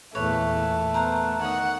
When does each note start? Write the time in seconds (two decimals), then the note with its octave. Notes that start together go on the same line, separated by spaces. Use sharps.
0.15 E2 A#2 A3 B4 C#5
0.94 B3 A#4 C5 F#5
1.41 D#3 C#5 D#5 F#5